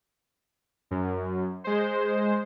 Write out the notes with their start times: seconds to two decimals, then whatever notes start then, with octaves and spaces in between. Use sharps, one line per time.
0.91 F#2
1.64 G#3 C5